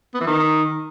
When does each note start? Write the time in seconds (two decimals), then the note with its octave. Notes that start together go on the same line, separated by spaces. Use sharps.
0.14 B3
0.21 E3
0.27 D#3